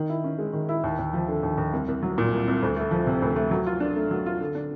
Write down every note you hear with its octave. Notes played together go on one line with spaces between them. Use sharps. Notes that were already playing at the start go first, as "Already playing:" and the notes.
Already playing: D#3
E4
C#4
G#3
D#3
E4
D#2
D#2
F3
D3
D#2
D#2
C2
C2
F#3
A#2
C2
C2
D2
A3
F3
C3
D2
A3
F#3
F4
D4
A3
F#3
F4
D3
D4